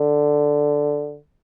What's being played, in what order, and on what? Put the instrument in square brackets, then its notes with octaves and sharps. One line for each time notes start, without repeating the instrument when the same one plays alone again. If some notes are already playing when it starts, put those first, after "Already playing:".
Already playing: [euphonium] D3